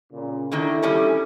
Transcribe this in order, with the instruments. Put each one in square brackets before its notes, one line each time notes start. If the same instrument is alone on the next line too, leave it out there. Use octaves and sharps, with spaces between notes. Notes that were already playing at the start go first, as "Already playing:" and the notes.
[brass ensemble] A#2 C#3
[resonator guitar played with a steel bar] D3 D#3 A#3 [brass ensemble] E4 A4
[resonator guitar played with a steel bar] E2 G3 C#4